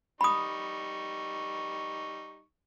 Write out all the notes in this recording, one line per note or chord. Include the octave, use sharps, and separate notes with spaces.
G3 D#4 B5 C#6 D#6